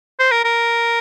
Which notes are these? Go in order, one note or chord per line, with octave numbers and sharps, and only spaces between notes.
C5
A#4
A#4